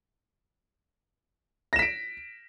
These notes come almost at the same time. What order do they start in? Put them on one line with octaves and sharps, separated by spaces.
A#6 E7 B6 D7